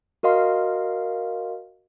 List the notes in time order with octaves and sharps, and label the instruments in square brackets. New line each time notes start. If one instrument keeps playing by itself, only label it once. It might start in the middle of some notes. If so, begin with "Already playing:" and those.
[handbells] F#4 A#4 D#5 F5 C6